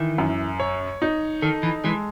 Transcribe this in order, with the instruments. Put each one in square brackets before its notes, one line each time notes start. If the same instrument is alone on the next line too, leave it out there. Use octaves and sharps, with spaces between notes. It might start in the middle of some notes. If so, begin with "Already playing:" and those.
Already playing: [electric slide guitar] D#3 [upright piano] E3
[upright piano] F#2
C#5
D#4
[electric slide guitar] D#3 [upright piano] A4
[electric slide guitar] E3
[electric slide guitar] E3 [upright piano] G#3